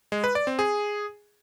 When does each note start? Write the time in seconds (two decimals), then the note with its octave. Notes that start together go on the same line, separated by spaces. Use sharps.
0.12 G#3
0.24 B4
0.35 D5
0.47 C4
0.59 G#4